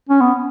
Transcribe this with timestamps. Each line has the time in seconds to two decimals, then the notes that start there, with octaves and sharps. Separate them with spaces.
0.09 C#4
0.21 B3